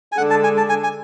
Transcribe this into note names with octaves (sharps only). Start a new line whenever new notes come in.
G#5
D3 G#3 D4 A4 F#5
A5
G#5
A5
G#5
G#5